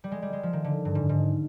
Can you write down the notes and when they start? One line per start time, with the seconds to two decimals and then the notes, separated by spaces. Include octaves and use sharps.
0.04 G3
0.12 G#3
0.22 G3
0.33 G#3
0.43 F3
0.53 D#3
0.64 D3
0.85 G2
0.95 G#2
1.09 G#2